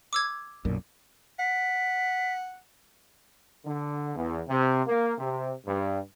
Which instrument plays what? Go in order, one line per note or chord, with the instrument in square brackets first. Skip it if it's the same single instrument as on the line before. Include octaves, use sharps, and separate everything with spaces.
[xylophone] D6 E6 G#6
[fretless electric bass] B1 F#2 A#2
[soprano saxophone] F#5 [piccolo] B6
[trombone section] D3
E2
C3
A#3
C3
G2